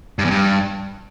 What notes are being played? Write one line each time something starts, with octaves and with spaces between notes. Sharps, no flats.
G2
E2
G2